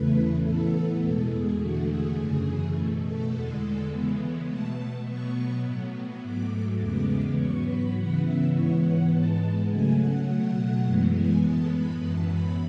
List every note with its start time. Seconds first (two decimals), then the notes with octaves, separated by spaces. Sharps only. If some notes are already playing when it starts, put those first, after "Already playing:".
Already playing: E2 C#3 E3 A3 B4
0.44 A2 E3 B3 A4
1.01 E2 B2 G#3 A4
1.31 G#4
1.60 E2 D3 A3 F#4
1.88 G#4
2.17 F#2 C#3 E3
2.75 B2 A3
3.04 A4
3.33 E2 D3 G#3
3.91 C#3 E3 G#3 B3
4.48 B2 A3 A5
5.06 B2 F#3 B3 C#6
5.64 A2 F#3 B3
6.22 G#2 F#3 A3 D6
6.79 E2 C#3 G#3 B3 D6
7.37 G#2 F#3 B3 C#6
7.66 B5
7.95 C#3 E3 B3 F#5
8.25 E5
8.53 G#2 E3 B3 C#5
8.82 F#5
9.11 G#2 G#3 B3 A5
9.69 C#3 F#3 A3 G#5
9.98 F#5
10.27 B2 F#3 A3 F#5
10.84 F#2 E3 G#3 B3
11.13 G#5
11.42 A2 G#3 B3 A5
11.71 B5
12.00 F#2 E3 B3 A5
12.29 B5